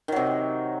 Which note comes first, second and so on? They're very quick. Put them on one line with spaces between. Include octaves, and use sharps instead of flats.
D#3 F#3 C3